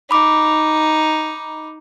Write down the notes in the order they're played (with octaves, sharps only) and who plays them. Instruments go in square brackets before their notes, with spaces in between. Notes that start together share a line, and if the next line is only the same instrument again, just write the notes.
[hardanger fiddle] D#4 [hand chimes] B5 D6